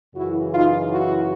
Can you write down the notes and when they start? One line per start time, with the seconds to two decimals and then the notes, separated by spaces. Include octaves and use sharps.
0.15 F#2 C#3 E3 E4 F#4
0.52 D#4 F4
0.90 E4 F#4